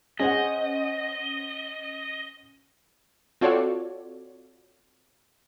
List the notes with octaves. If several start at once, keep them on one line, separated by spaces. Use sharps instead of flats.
C#4 G#4 C5 D#5 F#5
C4 F4 F#4 A4 C#5 D5